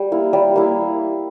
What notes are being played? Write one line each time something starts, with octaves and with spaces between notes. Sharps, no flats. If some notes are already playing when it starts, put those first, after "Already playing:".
Already playing: G3
A#3 E4
G3
A#3 E4